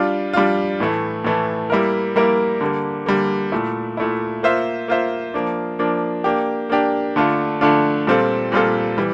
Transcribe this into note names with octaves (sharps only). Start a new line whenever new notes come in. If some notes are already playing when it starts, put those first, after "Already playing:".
Already playing: G3 D4 F4
G3 D4 F4
A2 E3 A3
A2 E3 A3
G3 A#3 E4 A#4
G3 A#3 E4 A#4
D3 G3 A#3
D3 G3 A#3
A#2 A3 E4
A#2 A3 E4
A#3 F4 C5 E5
A#3 F4 C5 E5
F3 A#3 D4
F3 A#3 D4
A#3 D4 G4
A#3 D4 G4
D3 A3 D4 F4
D3 A3 D4 F4
A#2 G3 C4 F4 A4
A#2 G3 C4 F4 A4
E3 G3